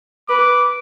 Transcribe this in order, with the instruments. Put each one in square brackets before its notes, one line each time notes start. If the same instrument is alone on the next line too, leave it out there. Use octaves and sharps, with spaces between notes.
[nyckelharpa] B4 [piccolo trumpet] D6